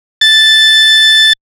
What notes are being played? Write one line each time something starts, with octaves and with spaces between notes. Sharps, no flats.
A6